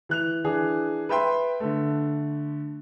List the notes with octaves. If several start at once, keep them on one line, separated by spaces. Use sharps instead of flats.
E3 F#6 F7
E3 D4 G#4
B4 E5 G5 C6
D3 A3